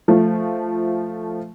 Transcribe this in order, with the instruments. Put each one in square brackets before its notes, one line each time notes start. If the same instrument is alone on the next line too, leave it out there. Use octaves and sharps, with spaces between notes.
[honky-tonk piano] F3 A3